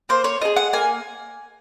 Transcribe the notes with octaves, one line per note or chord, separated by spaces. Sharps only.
A#3 C5
C#5
F4 G#4 D#5
F#5
A#3 G#5